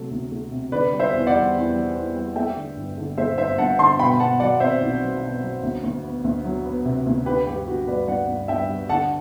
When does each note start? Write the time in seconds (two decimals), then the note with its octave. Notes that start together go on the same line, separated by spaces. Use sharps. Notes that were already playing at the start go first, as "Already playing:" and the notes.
Already playing: C3 F#3 A3
0.11 D2
0.32 A3
0.52 C3
0.72 D3 B4 D5
0.93 G3
1.00 C5 E5
1.13 E2
1.27 D5 F#5
1.34 G3
1.55 E2
1.74 G3
1.95 E2
2.16 G3
2.36 A3 E5 G5
2.56 D3
2.76 G1
2.97 D3
3.17 A3 C5 E5
3.38 G1 C5 E5
3.58 G2 F#5 A5
3.78 D3 A5 C6
3.99 B2 G5 B5
4.20 B2 F#5 A5
4.40 F#3 D5 F#5
4.60 C4 C5 E5
4.82 B1
5.01 F#3
5.22 B2
5.42 F#3
5.63 D2
5.83 D2
6.03 B3
6.24 D2
6.45 F#3
6.65 B3
6.85 C3
7.06 D2
7.26 D3 G4 B4
7.47 G2 G4
7.67 D3 F#4
7.87 G2 B4 D5
8.08 G2 D5 F#5
8.28 G2
8.48 G2 E5 G5
8.69 G3
8.89 D3 F#5 A5